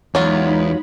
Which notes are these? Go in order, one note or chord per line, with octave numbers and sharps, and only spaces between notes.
E2 F#3 G#3 D#4 F4 B5